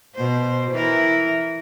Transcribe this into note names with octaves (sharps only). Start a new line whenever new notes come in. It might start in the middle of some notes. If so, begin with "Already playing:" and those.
B2 C5
E3 E4 A#4